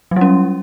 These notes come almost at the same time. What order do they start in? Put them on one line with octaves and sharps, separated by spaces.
F#3 G3 C#4